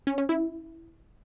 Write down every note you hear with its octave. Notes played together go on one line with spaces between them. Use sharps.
C#4
C#4
E4